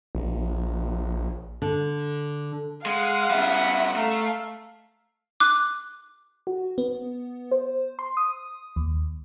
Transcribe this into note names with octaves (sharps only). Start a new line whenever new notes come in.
A#1
D3
G#3 F5 F#5
C#3 G3 E5
A3 F5 A#5
D6 F#6
F#4
B3
C5
C6
D#6
D#2